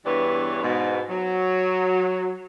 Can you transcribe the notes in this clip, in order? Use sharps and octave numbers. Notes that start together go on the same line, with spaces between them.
E2 G2 E3 D4 B4 C#5
G#2 B2
F#3